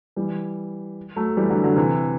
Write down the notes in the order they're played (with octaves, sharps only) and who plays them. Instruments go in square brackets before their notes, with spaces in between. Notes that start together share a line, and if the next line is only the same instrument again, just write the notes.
[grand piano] E3 G3
F#3 A3
E3 G3
D3 F#3
D3 F#3
C3 E3